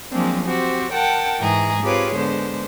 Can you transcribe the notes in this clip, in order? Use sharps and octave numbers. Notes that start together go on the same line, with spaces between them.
F3 F#3 G#3 A#3 C4 D4
C4 F#4 G4 C5
A#4 F#5 G5 A5
G#2 E3 G#4 A#5
C4 F4 G4 G#4 B4 C#5
D3 G#3 B3 C5